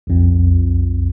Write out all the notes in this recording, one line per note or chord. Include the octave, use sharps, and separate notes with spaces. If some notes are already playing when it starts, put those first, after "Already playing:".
B1 F2